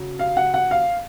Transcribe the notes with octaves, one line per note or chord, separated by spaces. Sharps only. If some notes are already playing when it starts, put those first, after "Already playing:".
Already playing: C#3 F#3
F5
F#5
F#5
F5